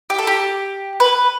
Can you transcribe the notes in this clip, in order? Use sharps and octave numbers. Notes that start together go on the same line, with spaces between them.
G4
A4
G4
B4